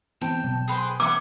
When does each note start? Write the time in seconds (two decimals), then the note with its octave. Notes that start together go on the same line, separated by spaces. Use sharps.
0.21 E3 B3 C4 G5 A5
0.44 B2 F#3
0.68 G#4 B4 C5 G5
1.00 C#4 E4 F#5 D6